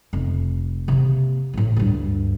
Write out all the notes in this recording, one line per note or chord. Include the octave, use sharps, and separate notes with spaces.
F1
C3 A#3
A1 A2
D2 G2